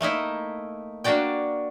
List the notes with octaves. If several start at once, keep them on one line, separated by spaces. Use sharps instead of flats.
A3 A#3 D#4 E4
A#3 D4 F#4 D5 G5